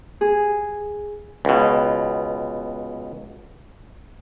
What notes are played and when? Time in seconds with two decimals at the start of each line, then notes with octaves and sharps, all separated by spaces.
0.21 G#4
1.45 C#2 B2